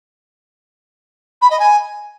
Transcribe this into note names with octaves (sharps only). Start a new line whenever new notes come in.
B5
D#5
G#5